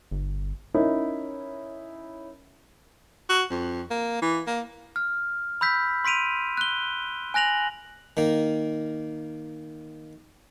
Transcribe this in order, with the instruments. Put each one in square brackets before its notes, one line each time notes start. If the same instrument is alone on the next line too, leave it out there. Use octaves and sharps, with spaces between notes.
[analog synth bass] G1
[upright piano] C#4 D#4 E4 A#4
[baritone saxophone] F#4
F2
A#3
E3
A#3
[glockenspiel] F6
B5 E6 G6 B6
C6 B6 D7 D#7 F7
F#6 G7
G#5 F#6 A#6 F7 F#7
[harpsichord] D#3 A#3